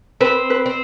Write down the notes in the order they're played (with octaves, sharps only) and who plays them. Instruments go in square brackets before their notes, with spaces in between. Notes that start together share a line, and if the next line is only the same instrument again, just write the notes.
[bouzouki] C4 [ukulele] B4
[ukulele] B4
[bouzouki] C4